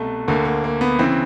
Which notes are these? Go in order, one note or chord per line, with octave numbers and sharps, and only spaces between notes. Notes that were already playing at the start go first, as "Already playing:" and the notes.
Already playing: C2 B2 A3
D2 D3 A#3
A#3
A#3
B3
C#3 E3 C4